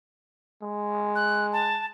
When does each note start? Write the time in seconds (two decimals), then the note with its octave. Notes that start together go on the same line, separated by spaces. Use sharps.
0.63 G#3
1.15 F#6
1.53 A5